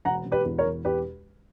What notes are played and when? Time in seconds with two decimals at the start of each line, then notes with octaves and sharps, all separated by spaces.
0.05 E1 F#5 A#5
0.26 E1
0.32 G4 B4
0.45 E2
0.58 A#4 C#5
0.65 E1
0.85 E2 G4 B4